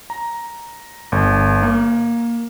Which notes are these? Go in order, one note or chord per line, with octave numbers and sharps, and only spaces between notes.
A#5
G1
A#3